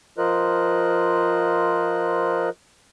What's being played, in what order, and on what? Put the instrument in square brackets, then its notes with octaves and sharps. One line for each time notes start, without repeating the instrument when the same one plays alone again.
[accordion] F3 F4 A#4 C5 D#5 F#6